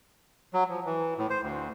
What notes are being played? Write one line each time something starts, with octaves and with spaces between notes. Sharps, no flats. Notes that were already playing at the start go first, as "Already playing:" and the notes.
F#3
F3
E3
A2
C5
D2